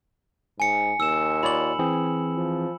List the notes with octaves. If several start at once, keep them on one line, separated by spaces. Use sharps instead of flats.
G#2 G#5 C#7
D#2 E6 E7
F4 C#5 D5 B5 F#7
E3 C4 G#4
F3